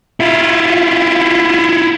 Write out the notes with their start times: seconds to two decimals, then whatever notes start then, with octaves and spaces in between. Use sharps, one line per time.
0.20 E4 F4